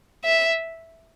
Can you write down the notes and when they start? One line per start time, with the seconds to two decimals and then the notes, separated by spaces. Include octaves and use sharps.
0.25 E5